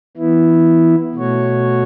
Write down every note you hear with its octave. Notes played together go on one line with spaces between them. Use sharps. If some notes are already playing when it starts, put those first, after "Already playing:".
E3 B3 E4
B2 A3 F#4 C#5